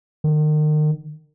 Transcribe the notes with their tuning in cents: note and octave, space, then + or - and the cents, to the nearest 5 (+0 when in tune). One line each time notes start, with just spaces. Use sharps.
D#3 -35